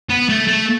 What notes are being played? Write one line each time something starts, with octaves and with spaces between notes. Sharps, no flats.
B3
A3
A3